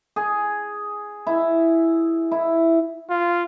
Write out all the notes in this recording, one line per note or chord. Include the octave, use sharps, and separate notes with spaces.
G#4
E4
E4
F4